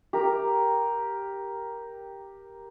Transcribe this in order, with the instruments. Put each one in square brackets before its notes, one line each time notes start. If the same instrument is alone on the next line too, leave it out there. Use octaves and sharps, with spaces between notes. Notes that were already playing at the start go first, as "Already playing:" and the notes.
[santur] G4 A#4